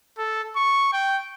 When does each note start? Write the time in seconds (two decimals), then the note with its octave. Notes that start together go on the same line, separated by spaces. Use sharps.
0.18 A4
0.56 C#6
0.93 G5